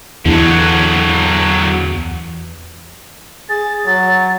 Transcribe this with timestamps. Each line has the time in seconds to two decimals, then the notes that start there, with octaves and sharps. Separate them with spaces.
0.25 E2 D3 E3 F#3
3.49 G#4 A6
3.86 F#3 A6